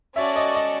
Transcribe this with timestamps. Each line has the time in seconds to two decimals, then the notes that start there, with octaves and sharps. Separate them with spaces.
0.15 C#4 F#4 A4 D5 E5
0.36 D#5
0.54 D#5